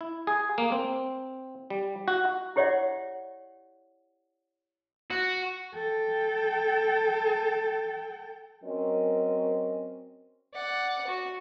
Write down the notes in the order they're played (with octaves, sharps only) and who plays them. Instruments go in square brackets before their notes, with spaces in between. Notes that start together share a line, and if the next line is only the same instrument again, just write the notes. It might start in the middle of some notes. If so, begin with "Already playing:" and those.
[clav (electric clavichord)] E4
G#4
A#3
C4
G3
F#4
[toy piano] E4 G4 C#5 D5 E5 F#5
[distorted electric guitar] F#4
[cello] A4 G5
[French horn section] F#3 C4 C#4 A#4 D#5
[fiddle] D5 F#5
F#4